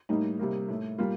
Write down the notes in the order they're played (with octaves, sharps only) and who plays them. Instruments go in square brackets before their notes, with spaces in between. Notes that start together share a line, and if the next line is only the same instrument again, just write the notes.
[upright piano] A2 G3 A#3 D#4
C3 G3 A#3
A2 A3
A#2 G3 A#3 F4